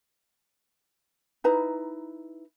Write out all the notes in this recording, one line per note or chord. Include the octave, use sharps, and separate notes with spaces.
D#4 E4 B4 A#5